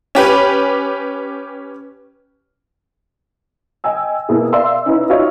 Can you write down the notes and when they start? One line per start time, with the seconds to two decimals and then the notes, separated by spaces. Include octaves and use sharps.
0.15 C#4 G4 B4
3.84 D#5 G5 G#5 E6
4.29 B2 A#3 E4 G#4
4.53 D5 E5 F5 C6 E6
4.86 C#4 D#4 E4 B4
5.10 D#4 F4 F#4 C#5 D5 E5